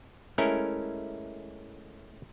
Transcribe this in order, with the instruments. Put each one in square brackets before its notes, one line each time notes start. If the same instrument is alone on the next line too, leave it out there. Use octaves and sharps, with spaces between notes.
[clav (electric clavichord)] G#3 A3 C#4 E4 A#4